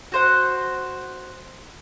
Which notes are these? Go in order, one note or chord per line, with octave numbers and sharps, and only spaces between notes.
F#4 C5 F#5